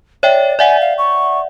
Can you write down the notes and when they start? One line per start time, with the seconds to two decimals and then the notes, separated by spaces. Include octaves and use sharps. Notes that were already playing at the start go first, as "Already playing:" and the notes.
0.23 C#5 D5 E5 G5
0.59 D5 E5 F#5 G#5
0.81 F5
0.98 C#6